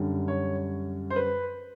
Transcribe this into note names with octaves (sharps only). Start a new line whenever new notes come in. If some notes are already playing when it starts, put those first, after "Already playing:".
Already playing: F#2 D3 G3
C#5
C5
B4